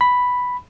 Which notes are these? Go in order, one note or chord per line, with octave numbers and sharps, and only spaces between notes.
B5